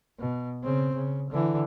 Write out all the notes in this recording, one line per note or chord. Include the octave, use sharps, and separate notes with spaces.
B2
C#3 C4
C#3
D3 E3